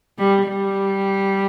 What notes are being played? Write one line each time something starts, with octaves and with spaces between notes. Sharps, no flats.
G3
G3